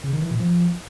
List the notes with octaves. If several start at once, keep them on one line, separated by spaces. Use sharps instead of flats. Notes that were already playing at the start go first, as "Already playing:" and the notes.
C#3
D#3
E3
A#2
F3